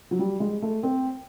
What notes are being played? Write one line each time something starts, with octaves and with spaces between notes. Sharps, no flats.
F#3
G3
G#3
A3
C4